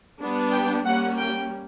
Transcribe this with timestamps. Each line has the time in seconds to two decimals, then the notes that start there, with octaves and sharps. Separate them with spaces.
0.19 G3 B3 D4
0.52 G5
0.85 G3 A#3 C#4 F#5
1.17 G5